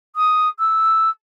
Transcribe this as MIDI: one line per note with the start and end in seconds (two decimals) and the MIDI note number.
0.16 0.48 87
0.59 1.10 88